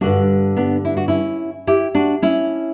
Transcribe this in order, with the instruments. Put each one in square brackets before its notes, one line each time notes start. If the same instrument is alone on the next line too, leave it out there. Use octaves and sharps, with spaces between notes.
[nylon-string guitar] G2 D3 G3 D4 F#4
B3 D4
E4
F#4
C#4 E4
E4 G4
D4 F#4
C#4 E4